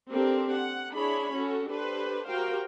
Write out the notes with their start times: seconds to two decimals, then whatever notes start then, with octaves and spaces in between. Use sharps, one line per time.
0.10 C4 D4 G4 A4 A#4
0.52 F#5
0.94 D4 E4 G#4 C#5 B5
1.34 C#4 F#4 A4
1.70 D4 G4 A4 B4 C5
2.29 F#4 G4 A#4 C5 F5 G5